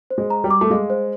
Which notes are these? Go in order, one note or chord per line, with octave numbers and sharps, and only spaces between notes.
C5
G#3
A#5
G3
D6
A3
G#3 F5
C5